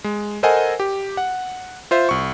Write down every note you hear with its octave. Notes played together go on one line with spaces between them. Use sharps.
G#3
A4 A#4 C5 D#5 F#5 G#5
G4
F#5
F4 C5 E5
C2 C#6